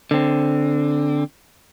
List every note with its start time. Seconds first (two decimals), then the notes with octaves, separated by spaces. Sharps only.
0.11 D3 C4